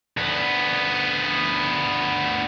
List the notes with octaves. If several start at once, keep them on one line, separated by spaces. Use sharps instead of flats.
D2 B3